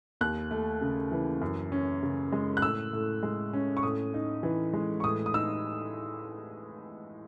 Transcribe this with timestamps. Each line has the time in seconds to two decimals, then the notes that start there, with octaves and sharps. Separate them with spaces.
0.21 D#2 F#6
0.51 A3
0.81 C#3
1.12 E3
1.41 F#2
1.72 C#4
2.03 C#3
2.32 G#3
2.57 F#6
2.62 A2 E6
2.93 A2
3.23 G#3
3.53 C#4
3.77 C#6
3.83 A2 D#6
4.14 D#4
4.43 E3
4.73 G#3
5.00 C#6
5.04 A2 D#6
5.26 D#6
5.34 D#4 E6